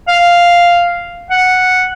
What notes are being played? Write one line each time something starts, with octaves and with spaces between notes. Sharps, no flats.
F5
F#5